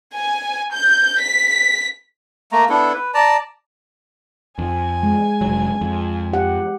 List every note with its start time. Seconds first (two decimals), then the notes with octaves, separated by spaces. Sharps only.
0.13 G#5
0.72 G6
1.19 B6
2.52 A3 A#3 A#5
2.69 B3 D4 E4 A4
2.93 B4
3.14 D5 A5 A#5
4.59 F2 G#5
5.03 G#3
5.41 F1 F#3
5.81 F2
6.33 G4 F#5